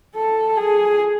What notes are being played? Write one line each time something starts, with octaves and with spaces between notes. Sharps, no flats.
A4
G#4